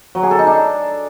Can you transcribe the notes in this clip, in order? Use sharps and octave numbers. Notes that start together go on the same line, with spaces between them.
F#3
G#4
A4
D#4
D4